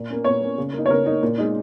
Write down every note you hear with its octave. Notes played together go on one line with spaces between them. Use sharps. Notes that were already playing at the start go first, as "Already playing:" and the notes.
Already playing: A#2
A#3 C#4
A#2 C#5
A#3 C#4
C#3
A#3 D#4
C#5
C#3 A#4
A#3 D#4
A#2
G#3 D#4